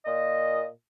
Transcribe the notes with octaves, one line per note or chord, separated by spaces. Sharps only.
A#2 D#5